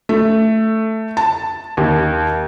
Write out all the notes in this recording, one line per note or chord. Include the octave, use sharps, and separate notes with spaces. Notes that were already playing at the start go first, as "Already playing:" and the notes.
A3
A5
D#2